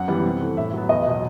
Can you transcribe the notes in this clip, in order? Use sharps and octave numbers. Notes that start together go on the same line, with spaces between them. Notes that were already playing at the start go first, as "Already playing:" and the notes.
Already playing: F#2 F#5
E3 G3 B3
C3
E3 A3
A2 E5
F#3 B3
E2 D#5
B2 F#3